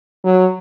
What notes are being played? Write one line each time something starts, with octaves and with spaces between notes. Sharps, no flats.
F#3